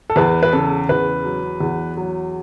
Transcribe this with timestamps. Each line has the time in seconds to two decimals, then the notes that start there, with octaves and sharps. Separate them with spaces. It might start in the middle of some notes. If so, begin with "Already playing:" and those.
0.10 A4
0.16 E2 B4
0.43 B4
0.53 C#3 A4
0.89 E2 B4
1.25 F#3
1.60 E2
1.97 F#3